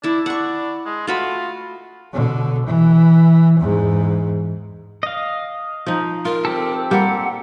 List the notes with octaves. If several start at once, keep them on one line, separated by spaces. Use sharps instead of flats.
D4 E4 A5
D4 F#5 C#6
G#3
A3 F4 F#4 B5
B2 D3
E3
E2 G#2
D#5 F5
F3 D#4
F4 A#4
C4 G4 A4
G3 A#3 F#5